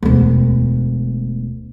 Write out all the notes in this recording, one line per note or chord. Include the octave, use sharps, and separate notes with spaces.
E1 D2